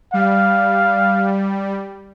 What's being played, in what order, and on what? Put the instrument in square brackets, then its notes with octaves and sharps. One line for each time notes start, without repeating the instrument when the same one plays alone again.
[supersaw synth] G3 [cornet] F5